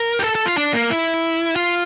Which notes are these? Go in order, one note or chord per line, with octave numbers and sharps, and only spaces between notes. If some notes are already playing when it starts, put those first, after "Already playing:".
Already playing: A#4
G4
A4
A4
F4
D4
A#3
E4
F4